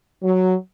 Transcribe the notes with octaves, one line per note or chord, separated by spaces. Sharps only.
F#3